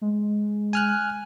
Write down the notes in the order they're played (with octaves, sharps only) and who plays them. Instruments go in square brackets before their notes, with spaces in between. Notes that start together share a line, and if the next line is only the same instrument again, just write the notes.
[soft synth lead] G#3
[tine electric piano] G#5 F6 F#6